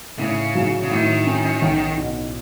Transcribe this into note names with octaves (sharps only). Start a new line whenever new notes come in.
A2 C#3
F#3
C#3
A2 D#3
C#4
B1
B2